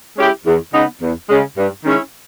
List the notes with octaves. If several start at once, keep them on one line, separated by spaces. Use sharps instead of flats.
G#3 C#4 E4 G4
E2
C#3 G#3 B3 D#4
E2
C#3 G#3
G2
D#3 G#3 C#4 E4